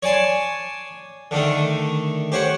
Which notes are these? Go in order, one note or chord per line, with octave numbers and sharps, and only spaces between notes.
C#5 D5 G#5 A5 C6
D3 D#3 A3
G4 C5 C#5 F#5